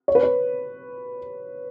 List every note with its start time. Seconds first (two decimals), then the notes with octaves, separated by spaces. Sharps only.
0.08 C#5
0.15 B4
0.23 C#5